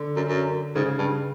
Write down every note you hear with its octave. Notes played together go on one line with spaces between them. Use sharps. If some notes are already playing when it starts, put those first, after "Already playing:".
Already playing: D3
F#2
F#2
G#2 C#3
G2